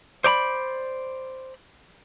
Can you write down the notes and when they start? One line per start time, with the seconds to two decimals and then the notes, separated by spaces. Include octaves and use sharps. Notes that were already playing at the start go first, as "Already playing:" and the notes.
0.24 C5 D5 A#5 B5